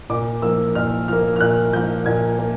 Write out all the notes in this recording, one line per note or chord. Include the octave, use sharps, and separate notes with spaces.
A#2 D6
F3 A#3 E6
A#2 F6
F3 A#3 F6
F6
A#2 F#6
F3 A#3 G6
A#2 G#6
A#3